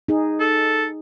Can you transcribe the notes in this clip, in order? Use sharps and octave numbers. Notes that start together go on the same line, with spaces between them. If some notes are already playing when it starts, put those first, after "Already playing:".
D#4 G#4
A4